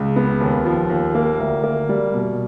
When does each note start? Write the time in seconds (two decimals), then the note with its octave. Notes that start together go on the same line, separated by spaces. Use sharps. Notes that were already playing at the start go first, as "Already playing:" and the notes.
Already playing: C#2
0.16 B3
0.41 D#2
0.65 F3
0.90 D#2
1.15 A#3
1.40 D2
1.64 A#3
1.89 G3
2.14 B2